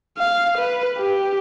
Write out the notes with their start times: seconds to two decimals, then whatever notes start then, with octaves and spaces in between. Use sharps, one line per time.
0.18 F5
0.58 B4
0.98 G4